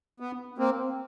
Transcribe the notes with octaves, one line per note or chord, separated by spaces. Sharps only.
B3
A#3 C4